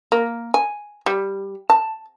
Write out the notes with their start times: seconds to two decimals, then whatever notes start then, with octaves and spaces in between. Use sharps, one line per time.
0.12 A#3
0.54 G#5
1.06 G3
1.70 A5